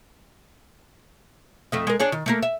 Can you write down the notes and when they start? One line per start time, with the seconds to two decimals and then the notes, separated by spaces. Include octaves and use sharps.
1.72 F2 A3 D#5
1.87 G#3 A#4
2.00 D4 G#4 C#5
2.12 D#3
2.26 A3 A#3 A#4
2.43 E5